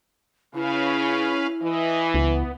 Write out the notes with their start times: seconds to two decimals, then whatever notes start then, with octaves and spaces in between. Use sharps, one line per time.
0.55 C#3 C#4 E4 B4 F5
1.62 E3 D#5
2.14 C#2 B3